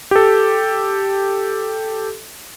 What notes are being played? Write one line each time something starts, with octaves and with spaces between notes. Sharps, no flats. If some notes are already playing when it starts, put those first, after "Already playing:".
G4 A4